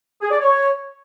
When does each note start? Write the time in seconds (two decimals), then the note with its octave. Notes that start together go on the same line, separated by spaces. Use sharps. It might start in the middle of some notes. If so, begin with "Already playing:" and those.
0.22 G#4
0.31 D5
0.40 C#5